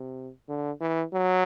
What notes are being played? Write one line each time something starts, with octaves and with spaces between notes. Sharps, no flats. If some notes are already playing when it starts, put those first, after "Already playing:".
Already playing: C3
D3
E3
F#3